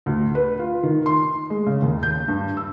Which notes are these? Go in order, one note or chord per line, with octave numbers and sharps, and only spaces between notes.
D2
B4
F4
D#3
C6
G#3
C#3
D#2
G6
G2
E6